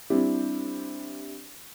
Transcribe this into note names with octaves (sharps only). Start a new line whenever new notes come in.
G3 C4 D4 E4 G4